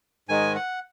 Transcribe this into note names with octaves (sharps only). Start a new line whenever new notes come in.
G#2 D#3 G#3 G#5
F#5